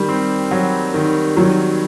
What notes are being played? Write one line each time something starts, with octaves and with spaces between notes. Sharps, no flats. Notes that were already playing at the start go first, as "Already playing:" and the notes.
Already playing: D#3 G3
C4
F#3
D#3
D#3 F#3